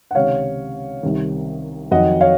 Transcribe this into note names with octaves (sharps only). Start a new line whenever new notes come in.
F#5
C#2 C3 D#3 C#5 F5
C2 C3 D#3
F2 D#3 F#3 D#5 F#5
C#5 F5